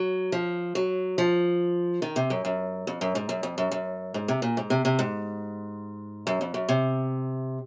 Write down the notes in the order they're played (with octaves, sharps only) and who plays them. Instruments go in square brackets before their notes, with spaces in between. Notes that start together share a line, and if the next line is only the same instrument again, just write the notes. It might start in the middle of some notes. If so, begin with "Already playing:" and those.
Already playing: [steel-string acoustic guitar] F#3
F3
F#3
F3
D#3
C3
F#2
F#2
F2
F#2
G#2
F#2
F2
F#2
F#2
G#2
C3
A#2
G#2
C3
C3
G#2
F#2
F2
F#2
C3